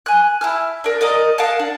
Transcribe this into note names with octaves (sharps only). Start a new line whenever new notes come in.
G#5 F#6
E4 A5 F6
D4 A#4
A#4 D5 D#5 A#5
A#4 F5 F#5 A5
D4